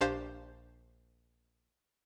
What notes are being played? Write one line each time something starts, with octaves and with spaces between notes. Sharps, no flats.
A#1 D4 G4 C5 F5 C7